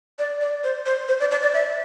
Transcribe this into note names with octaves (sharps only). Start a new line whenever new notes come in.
D5
D5
C5
C5
C5
D5
D5
D5
E5